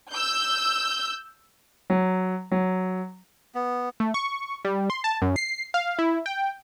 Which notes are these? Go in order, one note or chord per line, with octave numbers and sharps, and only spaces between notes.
E6 G6
F#3
F#3
B3
A3
C#6
G3
C6
A5
F#2
C7
F5
E4
G5